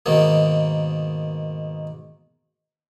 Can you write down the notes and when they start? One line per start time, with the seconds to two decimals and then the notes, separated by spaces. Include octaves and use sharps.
0.06 G#2 B2 D#3 A#3